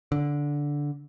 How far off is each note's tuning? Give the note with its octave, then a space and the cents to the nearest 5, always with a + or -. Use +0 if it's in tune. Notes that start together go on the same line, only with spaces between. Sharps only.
D3 -10